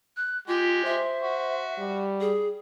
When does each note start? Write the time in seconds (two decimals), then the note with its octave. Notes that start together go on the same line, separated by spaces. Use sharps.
0.17 F#6
0.48 G#3 F4 G4
0.85 C5 E5
1.22 F#4
1.79 G3
2.21 G#4